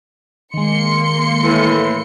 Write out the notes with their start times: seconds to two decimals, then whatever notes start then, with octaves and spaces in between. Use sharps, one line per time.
0.54 D#3 G#3 A#3 C6 C#7
1.44 A2 E3